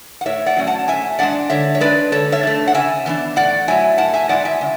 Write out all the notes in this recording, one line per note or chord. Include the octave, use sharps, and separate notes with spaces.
F#5
A2 C#5 E5
D5 F#5
F#3 A3 C#4
F#5 A5
A2 E5 G#5
G#3 B3 D4 D5 F#5
D3 C#5 E5
C#5
G#3 D4 B4 D5
D3 A4 C#5
C#5 E5
A3 D4
F#5
C#3 E5 G#5
E3 B3 D4
A2 D5 F#5
F#3 A3 E4 E5 G#5
A2 F#5 A5
E5 G#5
G#3 C#4 E4 D5 F#5
E5 G#5
C#3